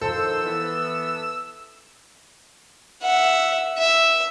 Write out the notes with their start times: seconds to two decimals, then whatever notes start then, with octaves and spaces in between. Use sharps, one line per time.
0.01 D#3 F3 A4 C5 E6
0.44 E3 B3
3.02 E5 F#5
3.78 E5